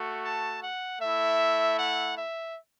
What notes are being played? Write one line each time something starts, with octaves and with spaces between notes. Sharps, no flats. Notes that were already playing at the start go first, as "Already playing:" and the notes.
Already playing: A3 F#4
A5
F#5
A3 E4 E5
F#5
E5